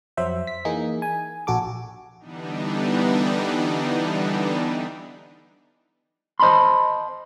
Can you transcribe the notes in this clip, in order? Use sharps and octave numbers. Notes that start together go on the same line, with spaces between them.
F2 F#3 C5 E5
B6
E3 A#3 D#4 G#4
G#5
A#1 F#4 A4 D6
D3 E3 G3 B3 D4 D#4
C5 D#5 A5 B5 C6